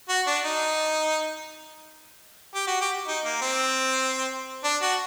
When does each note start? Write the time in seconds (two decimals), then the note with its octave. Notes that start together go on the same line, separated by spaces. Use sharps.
0.09 F#4
0.27 D4
0.44 D#4
2.55 G4
2.67 F#4
2.81 G4
3.07 D#4
3.25 A#3
3.41 C4
4.64 D4
4.82 F#4